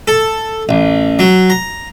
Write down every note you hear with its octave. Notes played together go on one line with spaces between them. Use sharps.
A4
A1
F#3
A#5